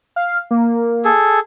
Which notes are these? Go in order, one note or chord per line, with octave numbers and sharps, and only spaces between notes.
F5
A#3
G#4 A4